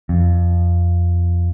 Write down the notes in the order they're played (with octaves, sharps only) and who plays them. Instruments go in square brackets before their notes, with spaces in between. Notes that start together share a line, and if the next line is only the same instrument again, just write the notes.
[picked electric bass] F2